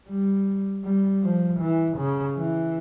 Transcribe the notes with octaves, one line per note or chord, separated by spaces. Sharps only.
G3
G3
F3
E3
C#3
E3